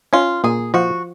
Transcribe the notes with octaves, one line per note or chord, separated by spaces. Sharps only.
C#4 F4
A#2 G#4
F3 F#4